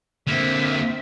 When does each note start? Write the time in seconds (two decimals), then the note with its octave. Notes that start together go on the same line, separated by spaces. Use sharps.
0.27 D3 A#3 C4 E5